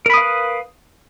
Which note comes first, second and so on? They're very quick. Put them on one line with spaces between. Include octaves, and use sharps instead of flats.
A#4 B5 D#6 F5 B4